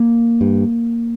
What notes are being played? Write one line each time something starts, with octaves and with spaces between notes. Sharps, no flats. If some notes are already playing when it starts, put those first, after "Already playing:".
Already playing: A#3
G2